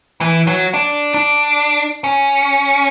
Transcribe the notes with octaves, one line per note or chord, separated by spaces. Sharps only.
E3
F#3
D4
D4
C#4